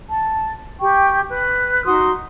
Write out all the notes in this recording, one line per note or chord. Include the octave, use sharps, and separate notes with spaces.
A5
G4 G5 C#6
B4 F#6
D#4 F#4 C6 D#6